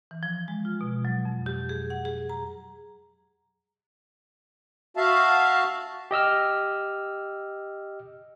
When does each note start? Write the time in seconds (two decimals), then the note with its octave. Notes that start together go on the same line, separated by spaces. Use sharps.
0.11 E3
0.23 F3
0.48 G#3
0.65 F4
0.81 B2
1.05 F#3
1.25 F2
1.46 G4
1.69 G#4
1.90 F#5
2.05 G#4
2.29 A#5
4.97 F#4 E5 F5 A5
6.11 G4 D#5 E6 F6